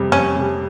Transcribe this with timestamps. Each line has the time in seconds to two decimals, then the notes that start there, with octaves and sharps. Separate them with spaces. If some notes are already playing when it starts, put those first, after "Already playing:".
Already playing: F2 C3 G3
0.12 F2 C#4
0.36 C3 G3